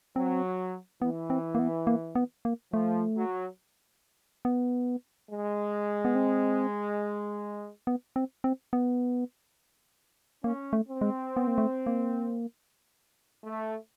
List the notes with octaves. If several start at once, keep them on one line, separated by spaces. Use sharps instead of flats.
F#3 C4
E3 B3
C4
A#3
B3
A#3
B3
A#3
F3 A3
F#3
B3
G#3
B3
C4
B3
C4
C4
B3
A#3 C#4
A3
C4
G#3
B3
A#3
A3
A#3
A3